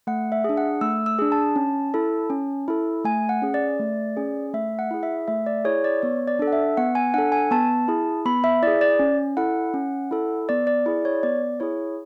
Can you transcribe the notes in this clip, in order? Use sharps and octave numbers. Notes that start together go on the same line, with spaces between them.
A3 F#5
E5
D4 G#4
F#5
A3 E6
E6
D4 G#4
A5
C#4
E4 A4
C#4
E4 A4
A3 G#5
F#5
C#4 G#4
D5
A3
C#4 G#4
A3 E5
F#5
E4 G#4
E5
A3 E5
D5
E4 G#4 C#5
D5
B3 C#5
D5
D4 A4
F#5
E5
B3 F#5
G#5
D4 A4 F#5
G#5
B3 A5
E4 G#4
B3 B5
E5
E4 G#4 D5
D5
C#4
E4 A4 F#5
C#4
E4 A4
B3 D5
D5
E4 G#4 D5
C#5
B3 D5
E4 G#4 C#5